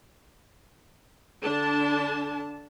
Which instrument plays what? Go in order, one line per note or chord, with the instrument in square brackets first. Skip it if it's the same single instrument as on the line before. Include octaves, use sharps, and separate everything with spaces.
[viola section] D3 D4 A5